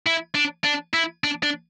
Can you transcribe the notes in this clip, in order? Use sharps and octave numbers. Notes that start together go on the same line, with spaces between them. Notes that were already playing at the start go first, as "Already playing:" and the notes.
E4
D4
D4
E4
D4
D4